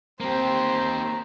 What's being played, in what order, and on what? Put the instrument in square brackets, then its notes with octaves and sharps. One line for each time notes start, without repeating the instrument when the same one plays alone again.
[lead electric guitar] A#3 G4 [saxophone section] C4 [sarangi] C5 [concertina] A#5